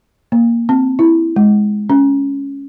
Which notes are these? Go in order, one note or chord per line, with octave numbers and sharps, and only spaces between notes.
A#3
C4
E4
G#3
C#4